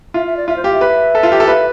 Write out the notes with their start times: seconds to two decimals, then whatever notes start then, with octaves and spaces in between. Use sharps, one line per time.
0.14 F4 E5
0.26 E5
0.37 D5
0.48 F4 E5
0.56 C5
0.64 G4 F5
0.72 E5
0.81 B4
1.15 A4
1.23 F4
1.32 G4
1.40 A4
1.47 B4 E5